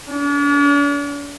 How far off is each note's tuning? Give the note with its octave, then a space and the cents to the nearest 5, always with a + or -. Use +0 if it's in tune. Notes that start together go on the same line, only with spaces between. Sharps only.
D4 -45